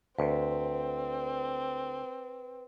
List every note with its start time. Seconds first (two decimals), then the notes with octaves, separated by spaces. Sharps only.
0.19 D2 C4 B4